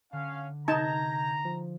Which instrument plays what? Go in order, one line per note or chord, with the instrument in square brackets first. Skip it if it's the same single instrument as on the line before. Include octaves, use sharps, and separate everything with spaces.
[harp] D3 [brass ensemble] C#4 F5
[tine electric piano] C3 G6 G#6 [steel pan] D#4 A5 [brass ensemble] A#5
[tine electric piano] F3